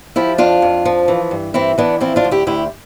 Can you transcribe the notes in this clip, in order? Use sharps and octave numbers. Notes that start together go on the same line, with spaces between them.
F3 E4 G4
F2 D4 F4
F2
F3
E3
G2
E3 C4 E4
E3 B3 D4
F3 C4 E4
D4 F4
D2
E4 G4
D2 E4 G4